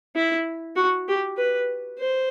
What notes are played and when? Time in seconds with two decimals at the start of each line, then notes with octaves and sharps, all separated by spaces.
0.16 E4
0.76 F#4
1.08 G4
1.38 B4
1.99 C5